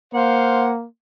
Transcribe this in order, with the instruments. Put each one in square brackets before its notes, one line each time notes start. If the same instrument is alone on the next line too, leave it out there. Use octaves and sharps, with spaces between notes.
[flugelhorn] A#3 [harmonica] C5 F5 F#5